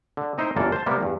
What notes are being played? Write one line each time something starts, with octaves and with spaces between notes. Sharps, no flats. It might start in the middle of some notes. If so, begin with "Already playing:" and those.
D3
C4 D#4 E4 C5
G1 F#2 E3 A#3 A4 D5
C5 A5
C3 G3 A#3 B3
E2 G2